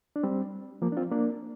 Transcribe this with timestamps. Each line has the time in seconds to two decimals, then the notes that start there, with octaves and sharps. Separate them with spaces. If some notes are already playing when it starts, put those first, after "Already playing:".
0.16 D4
0.23 G3 C4
0.82 F3 A#3
0.92 D4
0.97 C4 F4
1.11 A#3 D4